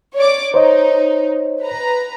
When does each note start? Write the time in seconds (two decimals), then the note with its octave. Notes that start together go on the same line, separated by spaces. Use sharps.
0.16 C#5 D5 D6
0.54 D#4 C5 C#5 D#5
1.62 B4 A#5